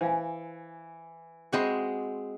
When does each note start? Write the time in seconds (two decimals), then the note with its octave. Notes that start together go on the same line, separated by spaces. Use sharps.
0.01 E3 C5 F5 G#5
1.52 G#3 C4 F#4 C5 D#5 E5 B5 C#6